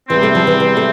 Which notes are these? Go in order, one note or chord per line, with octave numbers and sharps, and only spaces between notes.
E2 C3 E3 G3 C4
A3
F3
E3
E3
A3